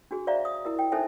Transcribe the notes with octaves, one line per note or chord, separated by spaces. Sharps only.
D4 F#4 G#4
C5 D5 E5 F5 A#5
D#6
E4 A#4 D#5
G5
C#4 D#4 A4 C5 E5 G#5